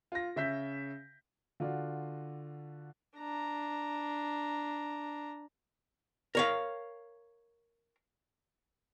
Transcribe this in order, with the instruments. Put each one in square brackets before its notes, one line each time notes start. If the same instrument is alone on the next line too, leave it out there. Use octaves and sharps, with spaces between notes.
[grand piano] F4 A#6
C#3 E5 G6 B6
[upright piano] D3 F4 F#4 D5
[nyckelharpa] D4 A#5
[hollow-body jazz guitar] A#4 C#5 F5